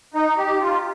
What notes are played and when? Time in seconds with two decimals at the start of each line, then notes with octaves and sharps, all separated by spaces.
0.14 D#4
0.37 G4
0.61 F4